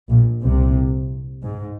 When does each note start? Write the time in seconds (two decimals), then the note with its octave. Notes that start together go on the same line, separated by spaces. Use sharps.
0.10 A#1 A#2
0.43 C2 C3
1.43 G#2